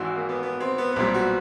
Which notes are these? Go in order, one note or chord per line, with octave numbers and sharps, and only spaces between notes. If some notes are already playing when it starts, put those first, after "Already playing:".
Already playing: G#1 G#2 E3 F#4
A#3
B3
B3
C4
B3
B3
B1 A#2 G3 C4
F#4